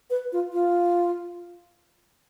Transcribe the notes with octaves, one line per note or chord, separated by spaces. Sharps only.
B4
F4
F4